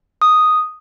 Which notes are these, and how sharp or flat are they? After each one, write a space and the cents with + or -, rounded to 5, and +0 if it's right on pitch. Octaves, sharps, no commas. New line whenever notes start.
D#6 +0